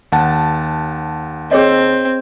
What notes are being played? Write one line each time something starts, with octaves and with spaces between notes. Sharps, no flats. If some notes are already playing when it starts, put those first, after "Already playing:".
D#2 F#5 A5
C4 G#4 C#5 D#5